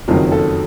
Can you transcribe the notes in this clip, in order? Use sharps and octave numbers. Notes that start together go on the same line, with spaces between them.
F#1 F2 D#3 F#3 F4
A4